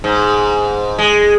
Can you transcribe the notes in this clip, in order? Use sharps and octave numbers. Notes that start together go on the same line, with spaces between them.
G#2
G#3